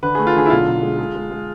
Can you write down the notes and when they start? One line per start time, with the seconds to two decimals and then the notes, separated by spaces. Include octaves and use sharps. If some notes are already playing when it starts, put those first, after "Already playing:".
0.03 D3 B4
0.15 A3 G#4
0.27 F4
0.35 D3 G#4
0.46 E4
0.50 B1 F4
0.67 B1
0.82 G#3
0.99 G#3
1.15 G#3
1.31 G#3